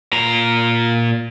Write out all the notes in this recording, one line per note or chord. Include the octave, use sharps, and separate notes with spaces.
A#2 A#5